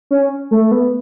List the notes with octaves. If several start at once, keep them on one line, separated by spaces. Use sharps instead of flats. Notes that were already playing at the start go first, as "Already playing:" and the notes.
C#4
A3
B3